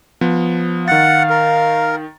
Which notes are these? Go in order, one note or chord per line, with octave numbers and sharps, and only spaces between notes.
F3 B3
D#3 F5 F#5 A6
A#4